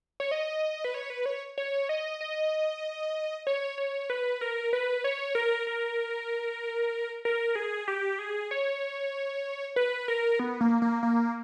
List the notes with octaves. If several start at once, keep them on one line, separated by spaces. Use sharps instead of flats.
C#5
D#5
B4
C#5
B4
C#5
C#5
D#5
D#5
C#5
C#5
B4
A#4
B4
C#5
A#4
A#4
A#4
G#4
G4
G#4
C#5
B4
A#4
B3
A#3
A#3
A#3